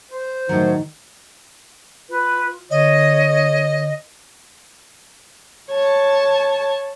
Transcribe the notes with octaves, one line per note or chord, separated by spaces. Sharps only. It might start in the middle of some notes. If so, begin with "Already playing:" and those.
C5
A2 D#3 F#3
F4 B4
D3 C#5 D#5
C#5 A5